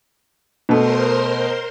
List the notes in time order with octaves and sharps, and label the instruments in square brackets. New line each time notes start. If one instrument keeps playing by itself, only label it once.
[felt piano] B2 A3 [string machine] A#4 C5 C6